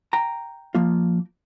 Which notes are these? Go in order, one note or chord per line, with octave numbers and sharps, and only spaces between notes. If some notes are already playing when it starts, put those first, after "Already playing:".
G5 A#5
F3 A#3 F4